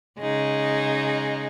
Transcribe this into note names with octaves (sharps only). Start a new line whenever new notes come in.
C#3 G#3 D#4